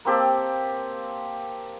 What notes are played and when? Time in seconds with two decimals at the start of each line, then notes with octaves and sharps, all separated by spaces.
0.05 A#3 C4 G4 A4